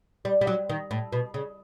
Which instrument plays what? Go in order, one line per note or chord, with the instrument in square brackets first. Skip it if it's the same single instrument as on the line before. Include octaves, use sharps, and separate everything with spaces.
[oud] G3
G3
F#3
D#3
A2
B2
C#3